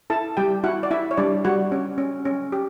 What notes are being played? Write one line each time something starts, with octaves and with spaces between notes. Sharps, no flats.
E4 A4 A5
G3 G4 G5
E4 F#4 F#5
D5
E4 E5
C#5
G3 D4 D5
G3 F#4 F#5
C#4
C#4
C#4
G4